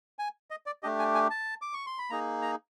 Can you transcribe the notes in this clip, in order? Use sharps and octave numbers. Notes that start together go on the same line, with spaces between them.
G#5
D#5
D5
A3 D4 G4 D#5
G#5
G#5
A5
D6
C#6
C6
B5
A#3 D#4 G#4 A#5
A#5